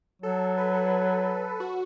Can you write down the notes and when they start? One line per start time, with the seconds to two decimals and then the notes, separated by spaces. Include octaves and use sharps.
0.22 F#3 A4
0.40 A4
0.58 B4
0.75 A4
1.60 F#4